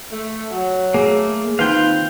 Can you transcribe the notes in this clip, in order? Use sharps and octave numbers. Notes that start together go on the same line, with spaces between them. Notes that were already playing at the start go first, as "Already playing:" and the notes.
A3
F#3
A3 A#3 G#4
D#3 A#3 C4 F4 B4 F5 G5